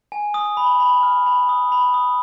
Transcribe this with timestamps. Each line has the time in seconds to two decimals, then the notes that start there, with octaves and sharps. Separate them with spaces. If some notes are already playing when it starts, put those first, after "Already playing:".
0.12 G#5
0.34 D#6
0.57 B5
0.80 B5
1.03 F6
1.26 B5
1.49 D#6
1.72 B5
1.94 D#6